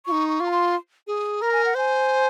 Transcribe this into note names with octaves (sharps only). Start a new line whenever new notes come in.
F4 C#6
D#4
C#6
F4
A#5
C6
G#4
A#4 A#5
G#5
F#5
C5 G#5